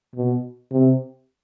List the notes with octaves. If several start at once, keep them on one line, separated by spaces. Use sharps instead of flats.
B2
C3